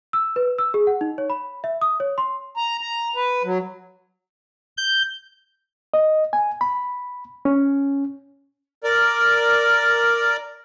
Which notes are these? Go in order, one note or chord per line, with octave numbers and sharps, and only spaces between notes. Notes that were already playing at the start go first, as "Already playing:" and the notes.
E6
B4
E6
G#4
F#5
D#4
C#5
B5
E5
D#6
C#5
C6
A#5
A#5
B4
F#3
G6
D#5
G#5
B5
C#4
A#4 D5